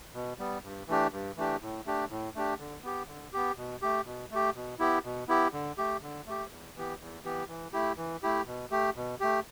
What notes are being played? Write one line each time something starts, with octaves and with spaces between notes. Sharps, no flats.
B2
G3 B3
G2
E3 A3 D4 G4
G2
E3 A3 D4 G4
A2
A3 D4 G4
A2
A3 D4 G4
D3
B3 G4
D3
B3 G4
B2
A3 G4
B2
A3 G4
B2
B3 E4 G4
B2
B3 E4 G4
D3
A3 G4
D3
A3 G4
E2
E3 B3 G4
E2
E3 B3 G4
E3
A3 E4 G4
E3
A3 E4 G4
B2
A3 G4
B2
A3 G4